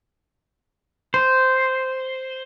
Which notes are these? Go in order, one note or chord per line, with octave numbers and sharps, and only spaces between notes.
C5